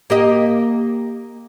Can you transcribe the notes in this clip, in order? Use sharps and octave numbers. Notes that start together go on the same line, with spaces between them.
A#3 G4 D#5